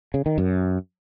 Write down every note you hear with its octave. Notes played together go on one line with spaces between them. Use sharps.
C#3
D#3
F#2